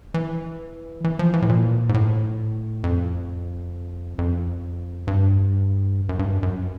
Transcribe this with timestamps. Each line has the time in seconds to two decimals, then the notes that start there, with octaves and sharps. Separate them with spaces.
0.14 E3
1.04 E3
1.19 F3
1.34 E3
1.42 A2
1.49 A#2
1.89 G#2
1.94 A2
2.84 F2
4.18 F2
5.07 G2
6.09 F#2
6.19 G2
6.43 F#2